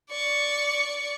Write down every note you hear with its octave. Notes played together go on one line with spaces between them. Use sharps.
D5 C#6